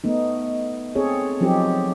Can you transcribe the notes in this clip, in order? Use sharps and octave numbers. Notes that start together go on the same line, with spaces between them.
A3 B3 D#4
C4 G#4 A4 C#5
F3 F#3 C4 D#4 G4 A4